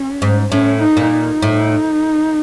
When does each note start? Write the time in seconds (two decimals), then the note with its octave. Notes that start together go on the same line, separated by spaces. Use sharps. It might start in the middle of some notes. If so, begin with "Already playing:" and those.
Already playing: C#4
0.22 G#2
0.51 A2 C#4
0.82 D#4
0.97 A#2
1.11 D#4
1.42 A2